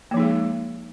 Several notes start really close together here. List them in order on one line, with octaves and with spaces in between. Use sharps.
A#3 F3 D#4 G#4 G#3